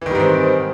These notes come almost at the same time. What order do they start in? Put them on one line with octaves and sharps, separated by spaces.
E3 D#3 G3 G#2 C4